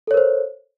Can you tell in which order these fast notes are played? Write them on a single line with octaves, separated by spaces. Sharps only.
A4 C#5 A#4 C5